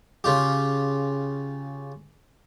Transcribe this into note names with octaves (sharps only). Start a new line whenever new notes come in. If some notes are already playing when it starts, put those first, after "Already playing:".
C#3 F4 G4